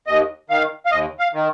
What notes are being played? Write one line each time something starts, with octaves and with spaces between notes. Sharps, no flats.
D#2 D#5
D#3 F5
F5
D#2 D#5
F5
D#3